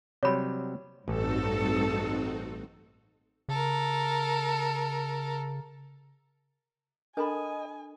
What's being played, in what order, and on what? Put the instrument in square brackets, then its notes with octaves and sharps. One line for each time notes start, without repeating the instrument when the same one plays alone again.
[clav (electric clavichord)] C3 F#3 G3 [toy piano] C#5 B5
[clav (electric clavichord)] A1 [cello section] G2 A4 [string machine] C4 D#4 F#4
[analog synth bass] C#3 [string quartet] A4 A#4
[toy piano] D4 A4 [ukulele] A#4 A5 B5 [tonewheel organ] D#5 [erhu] G#5